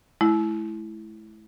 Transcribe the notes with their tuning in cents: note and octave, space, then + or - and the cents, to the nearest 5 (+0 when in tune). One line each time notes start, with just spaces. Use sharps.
A3 -45 E4 +0